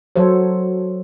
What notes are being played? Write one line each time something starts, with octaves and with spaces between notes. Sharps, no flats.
F#3 A4 C5 C#5